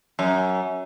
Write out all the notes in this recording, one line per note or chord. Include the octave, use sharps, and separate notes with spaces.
F#2